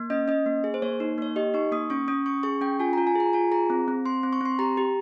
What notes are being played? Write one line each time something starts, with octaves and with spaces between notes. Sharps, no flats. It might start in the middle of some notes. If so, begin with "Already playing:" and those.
Already playing: A#3
C#4 D#5
C#4 D#5
A#3
G#4
C5
A#3 C#5
D#4
A#3 C#5
G4 D#5
D#4 C#6
A#3 D#6
C#4 C#6
C#4 D#6
C#4 C#6
G#4 C#6
C#4 G5
F4 G#5
F4 A#5
G#5
G#4 A#5
F4 G#5
G#4 A#5
C4
C4
C4 C6
C4
C#6
C4 C6
G4 A#5
G4